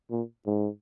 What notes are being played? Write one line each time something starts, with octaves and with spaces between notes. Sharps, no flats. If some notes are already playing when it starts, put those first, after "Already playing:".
A#2
G#2